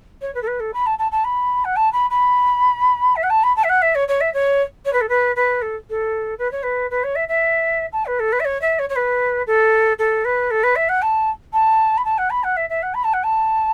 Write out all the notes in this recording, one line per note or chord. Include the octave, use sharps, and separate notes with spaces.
C#5
B4
A4
B4
A4
B5
A5
A5
A5
B5
F#5
A5
B5
B5
E5
F#5
A5
B5
A5
E5
F#5
E5
C#5
C#5
E5
C#5
C#5
B4
A4
B4
B4
A4
A4
B4
C#5
B4
B4
C#5
E5
E5
A5
B4
A4
B4
E5
C#5
E5
C#5
C#5
B4
A4
A4
B4
A4
B4
E5
F#5
A5
A5
B5
A5
F#5
B5
F#5
E5
E5
F#5
B5
A5
F#5
A5